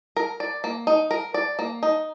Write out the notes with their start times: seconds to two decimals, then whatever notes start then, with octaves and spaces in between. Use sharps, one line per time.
0.17 A#4
0.40 D5
0.64 A#3
0.87 D#4
1.11 A#4
1.34 D5
1.59 A#3
1.83 D#4